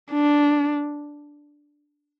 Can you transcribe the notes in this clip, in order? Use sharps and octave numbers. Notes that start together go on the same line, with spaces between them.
D4